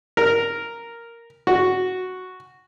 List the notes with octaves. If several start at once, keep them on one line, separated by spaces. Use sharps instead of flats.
A#4
F#4